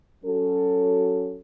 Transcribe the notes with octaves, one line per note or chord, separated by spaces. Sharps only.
F#3 C#4 F#4 A4